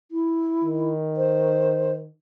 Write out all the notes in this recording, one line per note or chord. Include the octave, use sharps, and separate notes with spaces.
E4
D#3
C5